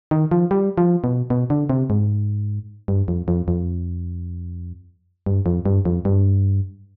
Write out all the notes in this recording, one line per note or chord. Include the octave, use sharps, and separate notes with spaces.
D#3
F3
G3
F3
B2
B2
D3
C3
G#2
G2
F2
F2
F2
G2
F2
G2
F2
G2